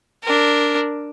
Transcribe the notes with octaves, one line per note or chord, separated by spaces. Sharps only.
D4 A#4